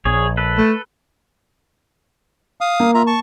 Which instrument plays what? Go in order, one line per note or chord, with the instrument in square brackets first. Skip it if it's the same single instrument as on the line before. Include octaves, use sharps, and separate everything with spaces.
[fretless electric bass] A#1 [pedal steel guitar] G#4 C#5
[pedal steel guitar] A4 B4
[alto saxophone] A3
[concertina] F5 D#6
[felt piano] A#3
[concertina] F4 E5 A#5
A5 C#6